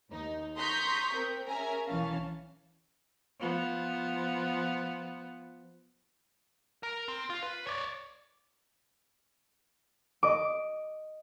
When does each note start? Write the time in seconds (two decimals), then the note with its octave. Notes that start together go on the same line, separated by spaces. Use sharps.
0.10 D#2 D#4
0.58 A#5 C6 C#6 D#6 G6 B6
1.15 C4 A#4
1.48 C#4 G#4 A#4 E5 G#5 A#5
1.87 B1 E3 C#4 F5 A5
3.40 F3 B3
6.83 A#4
7.08 C4
7.30 F4
7.43 B4
7.67 C#5 D5
10.23 D#5 D6